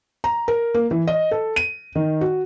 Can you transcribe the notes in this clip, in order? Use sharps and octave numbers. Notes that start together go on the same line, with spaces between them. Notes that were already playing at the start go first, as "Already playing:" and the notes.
A#5
A#4
A#3
E3
D#5
A4
D#7
D#3
F#4